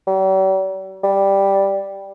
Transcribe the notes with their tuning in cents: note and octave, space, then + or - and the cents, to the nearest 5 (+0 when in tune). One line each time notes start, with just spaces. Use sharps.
G3 -45
G3 +0